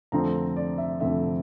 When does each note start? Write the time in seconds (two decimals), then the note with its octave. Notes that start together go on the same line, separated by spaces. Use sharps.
0.12 F2 D3 F3 A3 C4 A#5
0.57 D5
0.78 E5
1.00 F2 D3 F3 A3 C4 E5